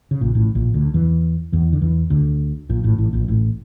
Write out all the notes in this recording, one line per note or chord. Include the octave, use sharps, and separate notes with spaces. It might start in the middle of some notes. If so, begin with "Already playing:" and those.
C#3
A#1 A#2
A1 A2
A#1 A#2
D2 D3
E2 E3
E2 E3
D3
E2 E3
D2 D3
A#1 A#2
A1 A2
A1 A2
A#1 A#2
A1 A2